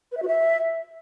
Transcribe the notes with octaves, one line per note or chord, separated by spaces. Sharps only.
B4
E5
F#4
E5